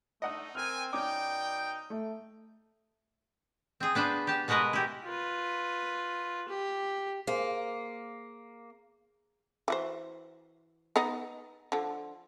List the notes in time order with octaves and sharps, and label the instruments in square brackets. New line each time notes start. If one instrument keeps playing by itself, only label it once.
[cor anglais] A3 [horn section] D4 D#4 [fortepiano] D#5 F#5 D#6
[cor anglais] C4 [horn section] A#4 G5 G#5 [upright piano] F6
[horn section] B2 D5 G5 [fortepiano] C#4 D6 [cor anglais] D#4
[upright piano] A3
[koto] C4 G#4
B3 D4 B4 C5
G4 A5
B2 G#3 F#4 A#4 B4 D#5
E4 G4
[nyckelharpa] F4 B4
G4
[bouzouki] A#3 [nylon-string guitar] G#4 C5
[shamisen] E3 F#4 C5
B3 D#4 D#5
D3 F3